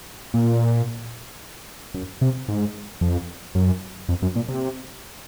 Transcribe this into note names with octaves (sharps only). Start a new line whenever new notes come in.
A#2
F#2
C3
G#2
F2
F#2
F2
F#2
A#2
C3